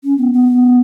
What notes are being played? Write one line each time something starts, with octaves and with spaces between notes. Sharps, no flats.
C#4
B3
B3